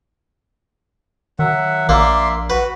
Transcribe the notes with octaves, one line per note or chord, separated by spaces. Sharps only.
D#3 F#3 E5 F#5
A#1 A#3 D5 E5 C6
F#4 B4